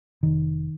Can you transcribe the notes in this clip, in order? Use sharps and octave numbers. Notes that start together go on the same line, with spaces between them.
F1 D#3